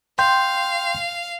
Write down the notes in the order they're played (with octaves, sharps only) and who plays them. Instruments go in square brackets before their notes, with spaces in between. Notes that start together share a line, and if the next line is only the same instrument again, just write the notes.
[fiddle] F5 [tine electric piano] G5 C6 G6